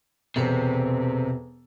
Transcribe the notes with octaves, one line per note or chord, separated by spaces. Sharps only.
E1 C3 A4 B4 C5